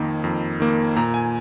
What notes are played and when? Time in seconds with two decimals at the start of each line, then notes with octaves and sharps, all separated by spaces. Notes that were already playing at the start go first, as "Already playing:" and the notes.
Already playing: F2 D#3 A#3
0.24 F2
0.60 D#3 A#3
0.96 A#2 A#5
1.14 G#5